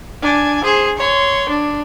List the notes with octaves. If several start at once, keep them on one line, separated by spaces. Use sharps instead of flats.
D4 G#5
G#4 C5
C#5 C6
D4